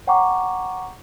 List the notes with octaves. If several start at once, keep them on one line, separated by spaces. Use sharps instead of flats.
C#5 F#5 G5 A#5 C#6 D6